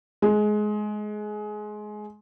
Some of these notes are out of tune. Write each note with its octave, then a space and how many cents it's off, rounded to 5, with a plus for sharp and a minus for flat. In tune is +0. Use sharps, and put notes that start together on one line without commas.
G#3 +20